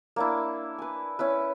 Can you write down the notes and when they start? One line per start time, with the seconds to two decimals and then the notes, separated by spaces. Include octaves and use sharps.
0.16 A#3 D4 E4
0.79 B4 G#5
1.19 C#4 E4 B4